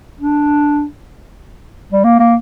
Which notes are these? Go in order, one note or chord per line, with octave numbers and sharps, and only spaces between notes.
D4
G3
A#3
A#3